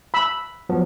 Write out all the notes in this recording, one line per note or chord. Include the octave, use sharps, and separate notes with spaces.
B5 E6
F3 F#3 B3